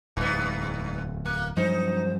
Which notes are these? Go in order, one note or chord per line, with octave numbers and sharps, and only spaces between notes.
D1 E2 G2 B3
A#3 F#6
G2 F3 F#3 D#4 C5